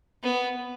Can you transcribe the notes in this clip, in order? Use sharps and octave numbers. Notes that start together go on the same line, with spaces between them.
B3